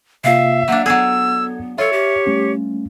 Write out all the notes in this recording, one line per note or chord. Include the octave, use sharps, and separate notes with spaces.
C3 A#3 F4 E5 F5
F#3 A#3 D4
F#3 B3 G#4 A4 E6 G#6
F4 A4 C#5 E5
G4
G3 A3 C#4